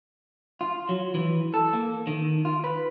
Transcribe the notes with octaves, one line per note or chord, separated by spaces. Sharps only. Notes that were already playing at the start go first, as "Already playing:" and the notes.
F4
F#3
E3
A4
A#3
D#3
F4
B4